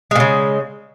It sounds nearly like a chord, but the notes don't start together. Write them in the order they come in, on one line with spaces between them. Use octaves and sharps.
G#3 A#2 C#3